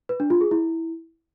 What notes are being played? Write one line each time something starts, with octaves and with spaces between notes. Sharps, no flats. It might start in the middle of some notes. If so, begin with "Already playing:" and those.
B4
D4
F4
G#4
E4